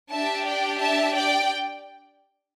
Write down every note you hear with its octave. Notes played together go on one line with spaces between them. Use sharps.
D4 G4 E5 A5
D5 G5
E5 A5
D5 G5